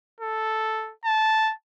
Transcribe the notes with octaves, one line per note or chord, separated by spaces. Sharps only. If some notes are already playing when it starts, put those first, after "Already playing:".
A4
A5